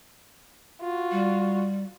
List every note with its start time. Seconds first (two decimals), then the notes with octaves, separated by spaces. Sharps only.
0.81 F4 F#4
1.11 G3